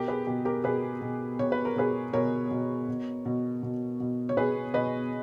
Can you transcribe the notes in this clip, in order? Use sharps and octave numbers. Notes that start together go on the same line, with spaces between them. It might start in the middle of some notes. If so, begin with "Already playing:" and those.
Already playing: B2 G4 A#4
G#4 B4
B2 G4
G4 A#4
B2 G#4 B4
B2
B2 C#5
B4
A#4
B2 G#4 B4
B2 A#4 C#5
B2
B2
B2
B2
B2
C#5
B2 G#4 B4
B2 B4 D#5